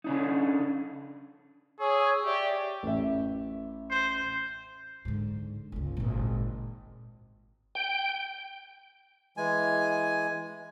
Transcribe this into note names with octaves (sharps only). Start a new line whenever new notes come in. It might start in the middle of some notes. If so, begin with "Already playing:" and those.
C#3 D4 D#4
G#4 C#5 C#6 E6
G4 D5 E5 C#6
A1 E5
C5
G#2 D3
G1 C#2
G#1 A#2
G5
E3 G#3 G#5